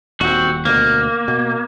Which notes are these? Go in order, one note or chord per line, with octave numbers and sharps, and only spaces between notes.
D#1 C4 F#4
D2 B2 A#3
B2